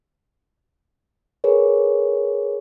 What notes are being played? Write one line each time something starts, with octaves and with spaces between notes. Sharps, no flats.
G#4 A#4 B4 C#5